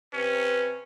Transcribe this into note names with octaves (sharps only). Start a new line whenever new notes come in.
C3 C#4 B4